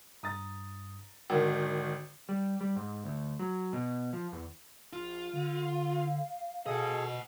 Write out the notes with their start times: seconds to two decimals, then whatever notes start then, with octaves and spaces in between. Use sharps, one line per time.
0.23 G2 A#5 D#6 A6
1.30 G#1 D3 D#3 F#4 A#4
2.29 G3
2.61 G3
2.76 G#2
3.04 D2
3.40 F#3
3.73 B2
4.13 F3
4.33 E2
4.93 A#1 F4
5.33 D3 F5
6.66 B2 G#4 A4 D#5 F#5